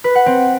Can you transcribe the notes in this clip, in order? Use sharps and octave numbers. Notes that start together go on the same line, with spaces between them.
B4
F#5
C4